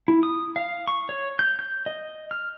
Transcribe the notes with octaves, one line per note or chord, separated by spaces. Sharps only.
E4
D#6
F5
C#6
C#5
G6
G6
D#5
F6